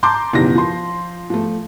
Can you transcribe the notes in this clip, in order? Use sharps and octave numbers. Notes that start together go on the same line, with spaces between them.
A5 A#5 C6 D6 G6
F#1 B2 D#3 E3 G4 A#6
F3 C6
F3 A3